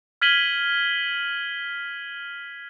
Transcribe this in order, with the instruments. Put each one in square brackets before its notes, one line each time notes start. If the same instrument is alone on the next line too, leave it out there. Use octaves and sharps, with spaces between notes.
[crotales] F6 G#6 B6 D#7 F#7 G7